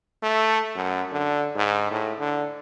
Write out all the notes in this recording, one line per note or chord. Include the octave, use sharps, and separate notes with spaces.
A3
F#2
D3
G#2
A2
D3